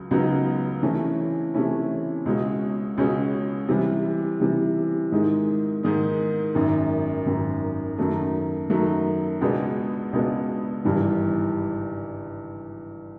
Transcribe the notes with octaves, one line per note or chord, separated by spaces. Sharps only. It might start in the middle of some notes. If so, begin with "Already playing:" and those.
Already playing: C#2 C#3 F#3
C#2 C#3 F#3 B3 D#4
C3 E3 A3 C#4 E4
C3 E3 A3 C#4 E4
C#2 B2 G#3 C#4
C#2 B2 G#3 C#4
C3 E3 G3
C3 E3 G3
G#2 D#3 G#3
G#2 D#3 G#3
G#1 F#2 D#3
G#1 F#2 D#3
F#2 D#3 F#3 A3
F#2 D#3 F#3 A3
C#2 B2 G#3 B3 D4
C#2 B2 G#3 B3 D4
G#1 G2 E3 G3